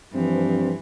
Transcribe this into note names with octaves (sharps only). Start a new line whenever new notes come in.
G2 E3 F3 C4